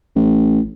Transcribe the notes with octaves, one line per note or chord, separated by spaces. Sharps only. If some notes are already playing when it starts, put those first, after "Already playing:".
A1